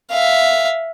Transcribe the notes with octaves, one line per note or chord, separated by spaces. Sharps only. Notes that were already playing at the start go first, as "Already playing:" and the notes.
E5 F5